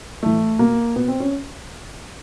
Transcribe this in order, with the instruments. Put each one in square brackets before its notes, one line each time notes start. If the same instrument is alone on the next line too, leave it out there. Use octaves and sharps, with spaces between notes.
[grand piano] A2 E3 A3
B2 A#3
B2 B3
C4
C#4